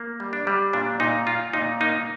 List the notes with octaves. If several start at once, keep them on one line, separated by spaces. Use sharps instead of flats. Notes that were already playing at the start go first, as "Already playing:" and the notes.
Already playing: A#3
G3
D4
G3
A#2 D4
A#2 D#4
A#2 F4
A#2 D#4
A#3 D#4